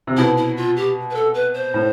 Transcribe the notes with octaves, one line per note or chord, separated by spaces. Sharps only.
C3
B2 E4
E4
F4
G4
B4
A4
B4
C5
A2